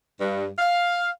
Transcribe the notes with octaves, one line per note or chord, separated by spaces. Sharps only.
G2
F5